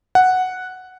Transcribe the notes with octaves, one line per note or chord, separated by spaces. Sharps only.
F#5